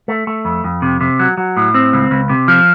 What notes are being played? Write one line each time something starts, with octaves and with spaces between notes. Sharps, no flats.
A3
A3
F2
F2
C3
C3
F#3
F#3
A2
C4
C#2
C#2
C3
F3